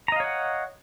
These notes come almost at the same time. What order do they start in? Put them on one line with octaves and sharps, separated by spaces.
A#5 D#5 F5 C#5 F#5